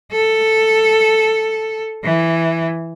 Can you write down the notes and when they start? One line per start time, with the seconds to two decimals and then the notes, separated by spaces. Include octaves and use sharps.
0.12 A4
2.04 E3